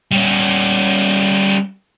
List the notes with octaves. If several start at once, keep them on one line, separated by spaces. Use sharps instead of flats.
G3 C#4